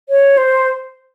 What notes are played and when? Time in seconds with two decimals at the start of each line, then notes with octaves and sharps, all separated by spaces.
0.09 C#5
0.37 C5